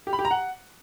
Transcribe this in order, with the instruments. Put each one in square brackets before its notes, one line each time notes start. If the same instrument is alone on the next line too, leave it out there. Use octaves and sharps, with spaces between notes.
[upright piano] G4
B5
G4
A#5
F#5